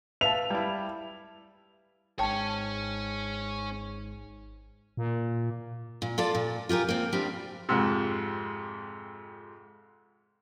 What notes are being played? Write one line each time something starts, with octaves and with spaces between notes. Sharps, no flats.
B4 E5 F5 A5 F7
G3 E4
G#1 G#2 C#4 C#5 G5 A5
A#2
A#2
F4 A4 D5
A#2
F4 G4 G#4 A#4
A#3 C4
G2 G3 C4
F2 G#2 C3